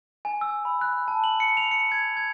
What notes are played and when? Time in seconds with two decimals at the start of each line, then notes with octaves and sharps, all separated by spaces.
0.25 G#5
0.41 E6
0.65 B5
0.81 F#6
1.08 A5
1.24 F#7
1.40 C#7
1.57 F7
1.71 C#7
1.92 G#6
2.17 G#6